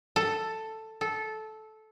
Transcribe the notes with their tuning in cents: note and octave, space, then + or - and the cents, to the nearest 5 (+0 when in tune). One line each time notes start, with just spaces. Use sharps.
A4 +5
A4 -15